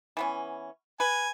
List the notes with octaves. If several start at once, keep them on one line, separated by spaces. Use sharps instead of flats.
E3 B3 C#4
B4 G#5